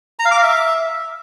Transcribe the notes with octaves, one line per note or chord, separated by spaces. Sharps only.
A#5
F5
D6
F5
E5